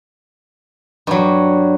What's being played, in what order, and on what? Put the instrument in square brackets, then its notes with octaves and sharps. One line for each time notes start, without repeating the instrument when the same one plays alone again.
[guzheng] G2 F#3